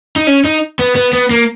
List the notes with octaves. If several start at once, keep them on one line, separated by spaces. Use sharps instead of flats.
D#4
C#4
D#4
B3
B3
B3
A#3